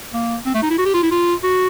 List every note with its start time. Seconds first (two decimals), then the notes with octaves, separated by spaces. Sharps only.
0.14 A#3
0.46 C4
0.54 A3
0.62 D#4
0.70 E4
0.78 F#4
0.86 G4
0.94 F4
1.03 E4
1.11 F4
1.44 F#4